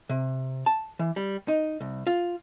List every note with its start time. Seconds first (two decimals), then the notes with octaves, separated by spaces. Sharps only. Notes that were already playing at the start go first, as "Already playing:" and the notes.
0.09 C3
0.66 A5
0.99 E3
1.16 G3
1.48 D#4
1.81 C2
2.07 F4